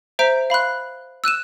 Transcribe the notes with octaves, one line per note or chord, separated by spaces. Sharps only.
C5 E5 A#5 G6 B6 D7
F5 B5 C6 F#6
E6 F#6 D#7 E7